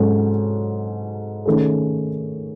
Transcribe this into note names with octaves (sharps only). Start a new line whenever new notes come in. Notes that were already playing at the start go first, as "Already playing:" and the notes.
Already playing: G#2 F#3 C#4 F#4 A4
D#3 A3 C#4 G#4